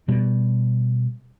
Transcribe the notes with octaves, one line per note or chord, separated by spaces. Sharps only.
B2 G3